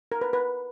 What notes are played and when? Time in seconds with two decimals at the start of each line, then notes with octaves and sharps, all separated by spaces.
0.12 A#4
0.21 B4
0.33 B4